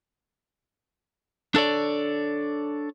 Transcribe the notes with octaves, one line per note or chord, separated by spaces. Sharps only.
D4 A4 C#5 D5